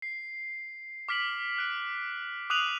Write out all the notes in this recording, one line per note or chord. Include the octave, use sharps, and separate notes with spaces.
C7
D6 F6 B6 D7 F#7
F#6 D7
D6 D#6 F#6 D#7 F7 F#7